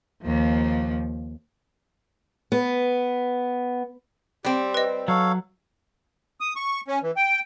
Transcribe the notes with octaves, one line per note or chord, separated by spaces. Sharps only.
D#2 F3
B3
G3 C4 G4
B4 D#5
F#3 A4 C#5 F5
D#6
C#6
C#4
E3
G5